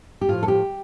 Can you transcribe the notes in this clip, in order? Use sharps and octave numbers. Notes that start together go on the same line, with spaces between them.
G4
A2 F3 F4
A4
G4